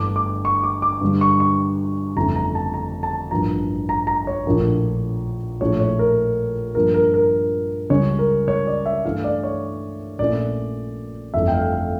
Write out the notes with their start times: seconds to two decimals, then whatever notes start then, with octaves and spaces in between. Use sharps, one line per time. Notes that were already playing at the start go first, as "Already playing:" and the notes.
Already playing: G1 G2 E3 A3 D4 D6
0.16 D6
0.45 C#6
0.63 D6
0.82 D6
1.01 G2 D3 G3
1.21 C#6
1.40 C#6
2.16 G1 F2 C#3 E3 A3 A#5
2.35 A#5
2.55 A5
2.74 A#5
3.03 A5
3.31 A1 G2 F3 A#3 A#5
3.89 A#5
4.07 A#5
4.27 C#5
4.46 A#1 A2 F3 A#3 D4
5.61 A#1 A2 F3 A3 C#5
5.80 C#5
5.99 A#4
6.75 G2 F3 A#3 A#4
6.94 A#4
7.14 A#4
7.90 C#2 C#3 G3 C#4 C#5
8.19 A#4
8.48 C#5
8.67 D5
8.86 E5
9.05 G2 E3 A3 E4 F5
9.24 D5
9.43 C#5
10.19 A#1 A#2 A3 C#4 E4 D5
11.34 G1 F2 E3 A3 E5
11.48 G5
11.54 F5
11.73 F5